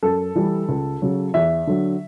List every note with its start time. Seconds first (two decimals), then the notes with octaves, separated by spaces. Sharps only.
0.03 F#2 A4
0.35 E3 G3
0.69 C#2
1.02 C#3 F#3
1.34 E2 E5
1.67 D3 F#3